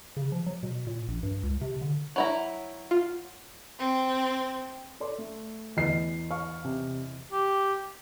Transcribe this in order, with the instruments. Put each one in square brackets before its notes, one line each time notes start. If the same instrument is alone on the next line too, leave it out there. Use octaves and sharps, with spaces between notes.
[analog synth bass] C#3
F3
F#3
B2
A#2
A#1
G2
C#2
C3
D3
[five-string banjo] F#3 E4 A#5
[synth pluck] F4
[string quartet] C4
[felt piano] A4 D5 C6
A3
[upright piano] E2 D#5 C7
[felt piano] F5 C#6 F6
C3
[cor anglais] G4